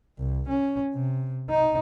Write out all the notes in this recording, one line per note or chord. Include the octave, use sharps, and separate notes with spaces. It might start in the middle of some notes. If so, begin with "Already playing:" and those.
C2
C#4
C3
D#4